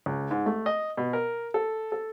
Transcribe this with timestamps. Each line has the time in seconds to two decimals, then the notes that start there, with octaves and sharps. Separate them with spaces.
0.06 C#2
0.31 G#2
0.46 A3
0.66 D#5
0.97 B2
1.13 A#4
1.54 A4
1.92 A4